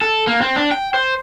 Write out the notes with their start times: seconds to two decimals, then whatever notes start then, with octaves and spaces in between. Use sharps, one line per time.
0.02 A4
0.27 A#3
0.41 C4
0.56 D4
0.72 G5
0.94 C5